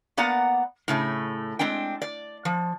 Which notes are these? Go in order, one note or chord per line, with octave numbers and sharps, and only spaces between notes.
A#3 B3 D5 F#5 A#5
A2 C#3 A3
G#3 C4 D4 G5
D5
F3